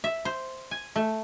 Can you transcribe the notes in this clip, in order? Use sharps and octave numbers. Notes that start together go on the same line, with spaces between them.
E5
C5
G#5
A3